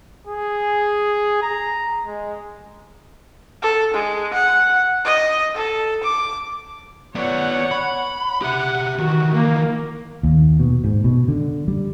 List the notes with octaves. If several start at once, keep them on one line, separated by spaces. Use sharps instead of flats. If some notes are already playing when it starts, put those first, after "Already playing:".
G#4
A#5
G#3
A4
G#3
F#5
D#5
A4
D6
B3 C#5 D5 F#5
B5
G4 E5 F#5
D#3 E3 F#4
A#3
D#2
B2
G#2
B2
D3
G3